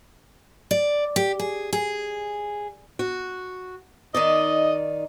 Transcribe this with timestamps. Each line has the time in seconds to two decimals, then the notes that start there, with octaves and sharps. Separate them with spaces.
0.71 D5
1.16 G4
1.40 G#4
1.73 G#4
2.99 F#4
4.14 D#3 D#4 D5 D#5